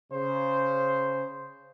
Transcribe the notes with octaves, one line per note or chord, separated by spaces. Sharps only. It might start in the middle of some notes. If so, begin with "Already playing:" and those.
C#3 C5